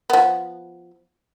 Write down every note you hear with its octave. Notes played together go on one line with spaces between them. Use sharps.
F3 B3